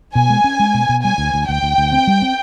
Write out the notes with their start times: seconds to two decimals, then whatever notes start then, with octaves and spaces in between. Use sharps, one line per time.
0.15 B2 G#5
0.30 G#3
0.44 C#4
0.60 G#3
0.74 B2
0.89 B2
1.04 G3 G#5
1.18 D2
1.34 D2
1.48 D2 G5
1.63 D2
1.78 D2
1.92 C4
2.07 G3
2.22 C4